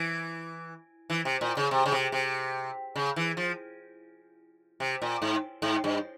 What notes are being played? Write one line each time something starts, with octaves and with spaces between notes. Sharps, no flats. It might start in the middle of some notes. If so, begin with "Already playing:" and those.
Already playing: E3
E3
C3
A#2
C#3
C3
C#3
C3
C3
C#3
E3
F3
C3
A#2
G#2
G#2
G2